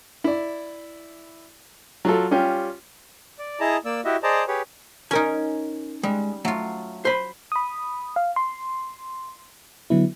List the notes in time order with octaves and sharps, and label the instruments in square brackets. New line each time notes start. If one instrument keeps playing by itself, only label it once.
[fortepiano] E4 D5
F#3 F4 A4
G3 C#4 F4 G4
[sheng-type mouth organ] D5
E4 G#4 D#5 A5 A#5
A#3 D5 E6
E4 F#4 G4 D#5 E5
G#4 C5 D5 D#5 A5 A#5
G4 G#4 B4 C#5
[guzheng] C#4 D#4 [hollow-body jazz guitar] A#4 G#5
[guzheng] G3 [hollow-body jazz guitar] G#3
[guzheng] F#3 F4 [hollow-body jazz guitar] A3
[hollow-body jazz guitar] C5 B5
[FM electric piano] B5 D#6
F5
C6
D3 F#3 B3 E4